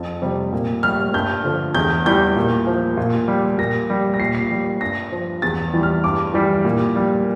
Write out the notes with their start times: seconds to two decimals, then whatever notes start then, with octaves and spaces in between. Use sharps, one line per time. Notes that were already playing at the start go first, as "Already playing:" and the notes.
Already playing: F2 A6
0.22 C3 G3
0.53 A#2
0.83 G3 F6
1.14 G2 G6
1.44 D3 F3
1.75 E2 G6
2.06 E3 G3 G6
2.37 A#2
2.67 F3
2.97 A#2
3.28 G3
3.58 A#2 A#6
3.90 G3
4.14 A#6
4.20 A#2 C7
4.35 C7
4.51 G3
4.81 G2 A#6
5.12 F3
5.42 E2 A6
5.73 E3 G3
5.83 F6
6.04 G2 D6
6.34 E3 G3
6.65 A#2
6.96 G3